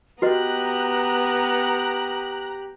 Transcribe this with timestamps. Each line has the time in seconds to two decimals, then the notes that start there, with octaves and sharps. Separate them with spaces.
0.22 B3 F#4 G4 B4 D#5 A#5 F#6